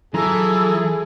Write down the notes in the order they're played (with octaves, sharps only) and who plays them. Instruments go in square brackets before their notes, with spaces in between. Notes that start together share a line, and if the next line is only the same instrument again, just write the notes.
[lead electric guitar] E3 [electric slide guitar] F#3 F4 A#5 [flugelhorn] G#4 [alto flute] A4